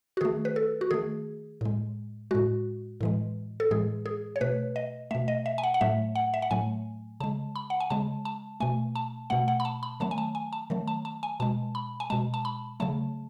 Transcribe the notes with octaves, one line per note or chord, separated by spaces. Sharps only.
F#4
D#3 A3 G#4
B4
A4
F#4
D#3 A3 G#4
A2 G#3
A2 G#3 F#4
A2 E3 G#3
A4
A2 E3 G#3 G#4
G#4
C#5
B2 A3 B4
D#5
B2 A3 E5
D#5
E5
G#5
F#5
F#5
A2 F#3 A3 E5
F#5
E5
F#5
A2 F#3 A3 G#5
C#3 G#3 A5
B5
F#5
G#5
C#3 G#3 A5
A5
B2 A3 G#5
A5
B2 A3 F#5
F#5
B5
A5
B5
D#3 F#3 A3 A5
G#5
A5
G#5
A5
D#3 F#3 A3
A5
A5
G#5
B2 G#3 A5
B5
G#5
B2 G#3 A5
A5
B5
C#3 F#3 A3 A5